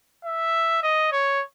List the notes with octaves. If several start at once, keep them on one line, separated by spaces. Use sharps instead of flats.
E5
D#5
C#5